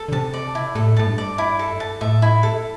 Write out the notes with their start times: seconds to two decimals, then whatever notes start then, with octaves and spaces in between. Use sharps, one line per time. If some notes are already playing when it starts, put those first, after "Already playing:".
Already playing: A4
0.08 D3
0.12 C3 A5
0.33 D5
0.55 E4
0.75 A2 A4
0.97 A2 A5
1.06 G2
1.18 D5
1.38 E4
1.59 A4
1.80 A5
2.01 A2 E5
2.22 E4
2.43 A4